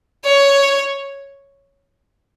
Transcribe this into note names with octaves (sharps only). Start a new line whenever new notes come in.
C#5